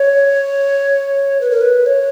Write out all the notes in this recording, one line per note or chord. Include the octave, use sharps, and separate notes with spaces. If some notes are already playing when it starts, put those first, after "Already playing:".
Already playing: C#5
B4
A#4
B4
C#5